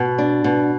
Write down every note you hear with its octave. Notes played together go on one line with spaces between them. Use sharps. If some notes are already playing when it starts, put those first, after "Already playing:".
Already playing: B2
D4
B2